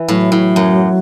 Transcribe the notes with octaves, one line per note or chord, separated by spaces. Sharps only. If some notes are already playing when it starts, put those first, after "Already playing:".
Already playing: E3
A2 F#3
A2
F#2